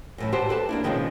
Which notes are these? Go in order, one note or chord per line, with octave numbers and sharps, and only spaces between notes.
F#2 A2 E3
G#2 F#4 G4 B4 C5 A5
A4 B4 G5 A5
A#3 D4 E4
B2 D#3 F3 G#3 C4 C#4